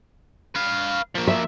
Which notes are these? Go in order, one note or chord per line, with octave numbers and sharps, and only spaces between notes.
B4 F5
F3 A#3
E5